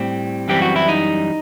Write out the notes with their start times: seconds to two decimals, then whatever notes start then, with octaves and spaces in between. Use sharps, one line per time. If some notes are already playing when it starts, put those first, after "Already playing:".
Already playing: A2 G3 C4
0.48 F#2 E3 G3 C4 G4
0.62 F#4
0.76 E4
0.88 D#4